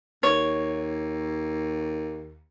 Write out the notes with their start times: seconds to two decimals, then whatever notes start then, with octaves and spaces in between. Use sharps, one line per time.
0.23 D#2 C#5